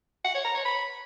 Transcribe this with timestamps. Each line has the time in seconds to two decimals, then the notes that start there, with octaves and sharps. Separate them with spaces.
0.25 F#5
0.35 C#5
0.45 A#5
0.55 C#5
0.65 B5